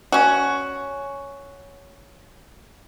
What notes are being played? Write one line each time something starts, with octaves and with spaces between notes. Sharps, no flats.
C#4 F#4